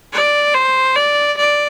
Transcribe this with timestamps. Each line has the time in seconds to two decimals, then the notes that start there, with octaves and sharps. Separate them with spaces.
0.13 D5
0.55 C5
0.96 D5
1.38 D5